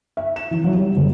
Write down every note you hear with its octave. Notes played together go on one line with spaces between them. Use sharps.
E5
E7
E3
F#3
G3
F#1